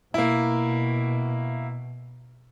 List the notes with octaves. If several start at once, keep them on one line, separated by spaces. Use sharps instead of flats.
B2 A#3 E4